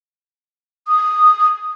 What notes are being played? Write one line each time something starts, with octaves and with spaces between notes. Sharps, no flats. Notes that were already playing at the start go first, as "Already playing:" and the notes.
D#6